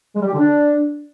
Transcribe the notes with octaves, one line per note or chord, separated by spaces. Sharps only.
G#3
G3
G4
D3
D4